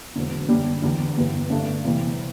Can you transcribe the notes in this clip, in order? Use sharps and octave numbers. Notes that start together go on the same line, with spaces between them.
E1 E2 D3 F#3
F#2 D3 G3 D4
E2 D3 G3
G1 G2 E3 G3 B3
G2 D3 A3 D4 G4
E2 C3 E3 G3